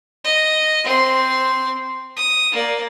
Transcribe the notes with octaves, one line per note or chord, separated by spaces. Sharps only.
D#5
C4 C6
D#6
A#3 D5